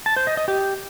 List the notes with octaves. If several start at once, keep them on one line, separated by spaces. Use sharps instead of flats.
A5
C5
D#5
D#5
G4